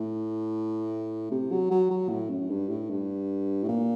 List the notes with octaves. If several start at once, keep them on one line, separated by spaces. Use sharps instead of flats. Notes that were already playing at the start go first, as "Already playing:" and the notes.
Already playing: A2
C3
F#3
F#3
F#3
A2
F#2
G2
A2
G2
A2
A#2